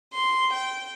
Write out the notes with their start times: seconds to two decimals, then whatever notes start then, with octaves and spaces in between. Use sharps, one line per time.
0.13 C6
0.52 G5